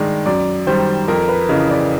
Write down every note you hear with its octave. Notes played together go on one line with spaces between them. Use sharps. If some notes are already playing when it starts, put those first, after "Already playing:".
Already playing: G2 D#3 G#3 D5
F#2 D5
D#3 G3 C5
F2 A#4
B4
C#3 E3 D#5
D5